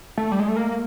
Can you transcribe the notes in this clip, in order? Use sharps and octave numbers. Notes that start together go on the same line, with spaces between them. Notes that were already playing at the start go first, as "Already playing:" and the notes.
A3
G3
G#3
A3
A#3